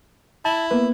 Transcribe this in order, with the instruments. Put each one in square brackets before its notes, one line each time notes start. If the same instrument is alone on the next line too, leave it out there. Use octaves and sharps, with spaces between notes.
[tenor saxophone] E4 [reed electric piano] A5
[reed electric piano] A#3 B3 B4